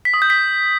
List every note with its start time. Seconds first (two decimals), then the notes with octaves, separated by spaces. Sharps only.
0.05 B6
0.14 D#6
0.22 G6
0.30 B6